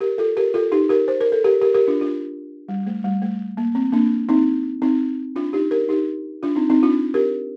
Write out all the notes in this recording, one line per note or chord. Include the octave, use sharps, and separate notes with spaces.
G4 A#4
F4 A4
G4 A#4
F4 A4
D#4 G4
G4 A#4
C5
A#4
A4
G4 A#4
G4 A#4
G4 A#4
D4 F4
D4 F4
G3
A3
G3
A3
A#3
C4
A#3 D4
C4 D#4
C4 D#4
D4 F4
D#4 G4
G4 A#4
D#4 G4
D4 F4
C4 D#4
C4 D#4
D4 F4
G4 A#4